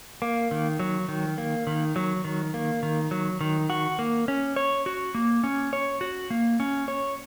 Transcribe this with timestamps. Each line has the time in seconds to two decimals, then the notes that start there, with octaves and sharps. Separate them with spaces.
0.22 A#3
0.51 D#3
0.80 F#3
1.08 D#3
1.38 A#3
1.67 D#3
1.96 F#3
2.24 D#3
2.54 A#3
2.83 D#3
3.11 F#3
3.41 D#3
3.70 F#4
3.99 A#3
4.28 C#4
4.56 C#5
4.86 F#4
5.15 A#3
5.44 C#4
5.73 C#5
6.01 F#4
6.30 A#3
6.60 C#4
6.88 C#5